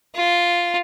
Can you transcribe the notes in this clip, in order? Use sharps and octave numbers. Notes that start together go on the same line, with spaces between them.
F4